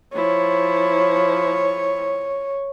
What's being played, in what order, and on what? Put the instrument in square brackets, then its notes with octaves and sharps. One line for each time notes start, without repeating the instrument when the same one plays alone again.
[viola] F3 E4 [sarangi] C#5